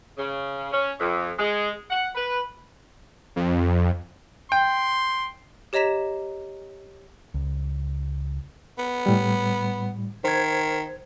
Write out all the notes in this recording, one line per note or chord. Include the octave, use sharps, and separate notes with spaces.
C#3
C#4
F2
G#3
F#5
B4
F2
G5 C6
G4 C#5 D#5 A#5 B6 E7
C#2
B3
A2 G3
D#3 C5 G#6